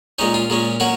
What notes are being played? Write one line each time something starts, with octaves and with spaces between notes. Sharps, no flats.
A#2 G#3 C#4 D#4
F4
A#2 G#3 C#4
F#3 A#3 C#4 F#4